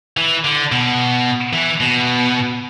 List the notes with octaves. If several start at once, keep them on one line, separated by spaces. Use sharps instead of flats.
E3
D3
B2
E3
B2